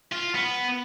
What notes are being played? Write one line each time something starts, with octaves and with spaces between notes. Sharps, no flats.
F4
B3